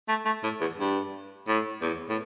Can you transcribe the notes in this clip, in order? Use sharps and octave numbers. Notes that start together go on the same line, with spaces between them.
A3
A3
A2
E2
G2
A2
E2
A2